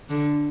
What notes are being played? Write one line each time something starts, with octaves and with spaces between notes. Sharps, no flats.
D3